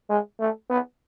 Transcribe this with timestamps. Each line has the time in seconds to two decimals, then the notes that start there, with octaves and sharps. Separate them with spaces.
0.10 G#3
0.40 A3
0.70 B3